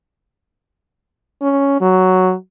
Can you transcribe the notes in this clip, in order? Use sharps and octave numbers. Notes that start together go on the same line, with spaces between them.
C#4
F#3